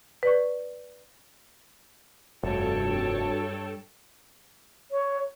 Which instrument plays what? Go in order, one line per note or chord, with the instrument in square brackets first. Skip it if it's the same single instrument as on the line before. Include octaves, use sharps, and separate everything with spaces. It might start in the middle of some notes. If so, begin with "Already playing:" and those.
[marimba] B4 D5 C#6
[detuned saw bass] F1 [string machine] G2 A4 [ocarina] F#4 [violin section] C#5 G5 A5
[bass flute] C#5